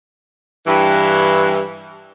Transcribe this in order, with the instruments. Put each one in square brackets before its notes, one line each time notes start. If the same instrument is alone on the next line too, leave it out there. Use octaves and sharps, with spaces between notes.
[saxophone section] G2 E3